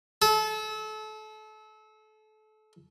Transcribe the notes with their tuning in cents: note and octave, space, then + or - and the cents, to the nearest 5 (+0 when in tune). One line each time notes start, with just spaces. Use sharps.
A4 -30